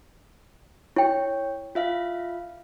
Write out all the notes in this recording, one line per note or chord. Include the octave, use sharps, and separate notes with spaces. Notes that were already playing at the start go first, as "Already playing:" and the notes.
E4 C#5 G5
F4 E5 F5